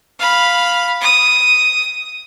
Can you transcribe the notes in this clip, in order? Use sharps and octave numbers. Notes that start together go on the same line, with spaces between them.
F5 B5
D#6